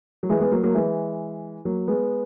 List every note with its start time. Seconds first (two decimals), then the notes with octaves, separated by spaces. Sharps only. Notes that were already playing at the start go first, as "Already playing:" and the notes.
0.23 F#3
0.29 E3 G#3
0.40 G#3 B3
0.52 F#3 A#3
0.63 F#3 A#3
0.75 E3 G#3
1.65 F#3 A#3
1.88 G#3 B3